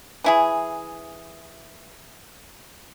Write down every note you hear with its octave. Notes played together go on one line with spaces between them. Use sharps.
E3 E4 G#4